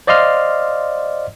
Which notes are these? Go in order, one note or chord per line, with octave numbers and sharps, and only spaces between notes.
C5 D5 D#5 F5 C6 F6